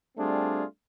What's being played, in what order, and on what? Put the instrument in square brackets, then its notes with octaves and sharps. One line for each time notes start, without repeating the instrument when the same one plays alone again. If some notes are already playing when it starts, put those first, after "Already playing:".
[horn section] G3 A3 C4 D4 F4 G#4